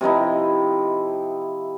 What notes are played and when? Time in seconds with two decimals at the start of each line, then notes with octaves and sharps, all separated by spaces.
0.01 C3 F3 D#4 E4